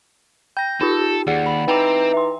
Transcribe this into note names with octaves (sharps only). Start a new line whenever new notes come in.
G5 G6 A#6
D#4 F4 G4 A4
D#2 G#4 D5 F#5
B5
E3 C4 D#4 G5 A#5 D6
E5 C6